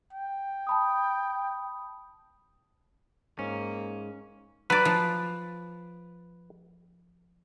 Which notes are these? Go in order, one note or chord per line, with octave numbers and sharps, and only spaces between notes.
G5
A5 B5 D#6
G#2 A#3 C#4
F#3 B4 D5
F3